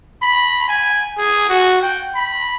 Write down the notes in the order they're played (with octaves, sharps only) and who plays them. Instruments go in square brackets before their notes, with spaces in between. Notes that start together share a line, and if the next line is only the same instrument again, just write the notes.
[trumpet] B5
G#5
G#4
F#4
G5
B5